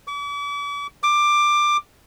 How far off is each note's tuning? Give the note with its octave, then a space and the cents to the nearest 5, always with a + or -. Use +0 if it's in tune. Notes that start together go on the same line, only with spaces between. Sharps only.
D6 -45
D6 +15